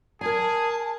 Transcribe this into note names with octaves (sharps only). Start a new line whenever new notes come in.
G#4 A#4 G#5 A5